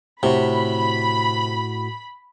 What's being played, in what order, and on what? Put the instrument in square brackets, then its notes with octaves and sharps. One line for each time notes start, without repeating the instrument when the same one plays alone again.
[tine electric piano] A2 F#4 [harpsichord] C3 [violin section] B5